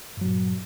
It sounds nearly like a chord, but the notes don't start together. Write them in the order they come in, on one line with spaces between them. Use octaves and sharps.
G2 F#3 A#2